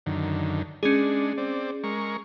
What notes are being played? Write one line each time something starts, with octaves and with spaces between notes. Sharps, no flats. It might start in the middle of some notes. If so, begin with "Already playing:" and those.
F#2 D3 D#3
G#3 C#4 D4 G#4
C4 D5
G#3 A#4 C#6